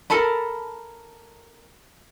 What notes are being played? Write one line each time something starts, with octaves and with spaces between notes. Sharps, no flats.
A4 A#4 A5 B5